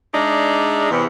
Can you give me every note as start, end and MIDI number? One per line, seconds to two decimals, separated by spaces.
0.14 0.91 56
0.14 0.91 62
0.14 0.91 63
0.14 0.91 68
0.14 0.91 74
0.14 0.91 76
0.91 1.04 40
0.91 1.04 48